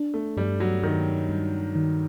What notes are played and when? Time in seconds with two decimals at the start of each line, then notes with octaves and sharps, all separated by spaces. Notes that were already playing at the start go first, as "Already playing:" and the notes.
Already playing: D4
0.14 A3
0.37 G2 G3
0.60 F#3
0.83 G2 D#3
1.29 G2
1.75 D#3